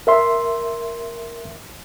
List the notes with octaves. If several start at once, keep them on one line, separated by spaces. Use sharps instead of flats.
A#4 E5 C6